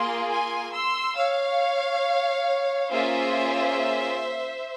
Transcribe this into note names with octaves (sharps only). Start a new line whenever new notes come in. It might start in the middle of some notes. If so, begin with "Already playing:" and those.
Already playing: A#3 F4 G#4 C6
G#5 C6
C6 E6
C#5 F5
A#3 C#4 F4 G#4 C5 E5